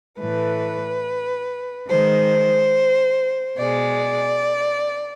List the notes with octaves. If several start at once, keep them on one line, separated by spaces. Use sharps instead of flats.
A2 E3 A3 B4
D#3 G#3 C5
B2 G#3 D5